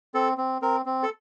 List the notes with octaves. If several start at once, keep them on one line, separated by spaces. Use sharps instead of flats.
C4 A4
C4
C4 A#4
C4
A4